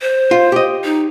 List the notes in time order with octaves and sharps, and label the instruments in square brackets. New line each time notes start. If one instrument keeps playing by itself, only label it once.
[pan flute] C5
[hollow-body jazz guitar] F4
G4 D#5
[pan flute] D#4